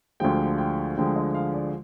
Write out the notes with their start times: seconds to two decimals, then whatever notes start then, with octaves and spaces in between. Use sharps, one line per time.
0.20 D2 D3 F3 G#3 G5
0.58 G5
0.97 D2 D3 F3 G#3 G5
1.16 D#5
1.34 F5
1.54 D5